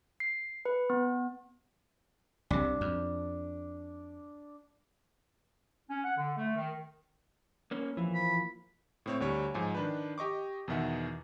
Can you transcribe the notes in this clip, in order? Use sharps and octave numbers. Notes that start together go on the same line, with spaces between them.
C7
B4
B3
C2 C3 D4
F2
C#4
F#5
D3
A3
D#3
A#3 C#4
E3 F3 A#3
B5
A2 C4 C#5
D2 G3 C#5
G#2 F3 D#4 G#5
D#3 D4 B4
G4 D#5 C#6 D6
E2 B2 D#3 E5 F#5